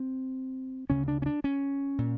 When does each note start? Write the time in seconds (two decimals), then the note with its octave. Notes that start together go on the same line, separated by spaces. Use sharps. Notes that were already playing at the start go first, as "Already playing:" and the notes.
Already playing: C4
0.90 D2 C#3 C#4
1.08 D4
1.22 C#4
1.26 D4
1.44 C#4
1.98 A#2